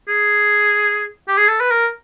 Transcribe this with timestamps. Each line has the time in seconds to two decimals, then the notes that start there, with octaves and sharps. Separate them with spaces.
0.08 G#4
1.28 G4
1.37 G#4
1.48 A4
1.61 B4
1.71 A#4